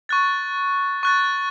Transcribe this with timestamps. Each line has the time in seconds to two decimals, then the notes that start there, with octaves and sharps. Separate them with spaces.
0.09 C#6 F#6 A6
1.03 C#6 F#6 A6